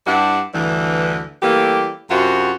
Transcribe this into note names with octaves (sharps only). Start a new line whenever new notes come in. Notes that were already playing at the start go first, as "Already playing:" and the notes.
G2 G3 D4 E4 F#5
D2 G2 E3
E3 G3 A3 A#3 G4
F#2 C3 F4 F#4